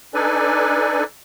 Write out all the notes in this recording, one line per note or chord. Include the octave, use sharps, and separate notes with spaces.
D4 D#4 A4 B4 D5 G#5